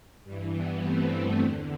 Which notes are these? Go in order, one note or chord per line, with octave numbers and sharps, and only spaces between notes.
G2 E3 G3
G3 B3
A3 C4
E2 D3